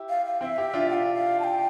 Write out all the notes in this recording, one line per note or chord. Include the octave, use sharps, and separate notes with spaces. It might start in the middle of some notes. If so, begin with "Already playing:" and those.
Already playing: E4 G4
F5
F5
C4 E4 F5
E5
E4 G4
D4 F4
G5
F5
F5
A5
G5